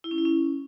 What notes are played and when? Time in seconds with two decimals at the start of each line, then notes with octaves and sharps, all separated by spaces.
0.04 E4
0.11 C#4
0.18 E4
0.25 C#4